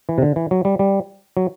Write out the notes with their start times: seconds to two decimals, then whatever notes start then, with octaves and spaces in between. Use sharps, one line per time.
0.09 E3
0.18 C3
0.22 D3
0.36 E3
0.51 F#3
0.65 G3
0.79 G3
1.37 F#3